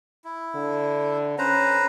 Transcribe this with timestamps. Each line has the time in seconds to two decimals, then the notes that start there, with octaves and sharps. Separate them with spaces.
0.24 E4
0.55 D3
1.38 C#4 B4 C5 A#5